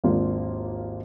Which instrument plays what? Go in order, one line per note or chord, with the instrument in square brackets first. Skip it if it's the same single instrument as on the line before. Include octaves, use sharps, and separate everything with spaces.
[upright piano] G#1 D#2 A#3 D4 F4